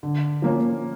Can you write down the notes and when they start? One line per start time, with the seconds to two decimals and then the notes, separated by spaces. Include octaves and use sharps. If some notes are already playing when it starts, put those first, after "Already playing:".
0.03 D3
0.42 F3 A#3 C#4